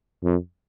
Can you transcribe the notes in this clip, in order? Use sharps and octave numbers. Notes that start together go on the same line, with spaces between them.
F2